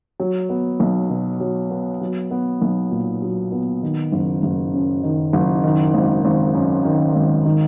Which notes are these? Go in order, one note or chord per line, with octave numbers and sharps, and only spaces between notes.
F#3
B3
B1
B2
F#3
B3
F#3
B3
B1
A#2
F#3
B3
D#3
F#1
F#1
F#2
D#3
F#1
D#3
G#1
G#1
F#2
D#3
G#1
D#3